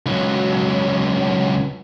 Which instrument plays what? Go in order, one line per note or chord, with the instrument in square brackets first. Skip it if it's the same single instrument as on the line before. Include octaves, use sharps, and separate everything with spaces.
[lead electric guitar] C#2 F#3